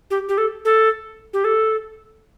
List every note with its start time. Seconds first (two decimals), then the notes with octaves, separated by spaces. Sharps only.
0.11 G4
0.29 G4
0.38 A4
0.65 A4
1.33 G4
1.44 A4